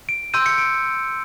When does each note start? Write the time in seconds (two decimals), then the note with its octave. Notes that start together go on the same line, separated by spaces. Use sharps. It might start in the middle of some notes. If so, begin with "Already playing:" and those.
0.09 D7
0.34 C6 E6 G6 D#7
0.46 C#7
0.58 D7